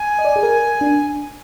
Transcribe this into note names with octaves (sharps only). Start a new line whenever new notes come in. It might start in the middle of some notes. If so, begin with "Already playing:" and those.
Already playing: G#5
D#5
D5
G#4
A#4
D4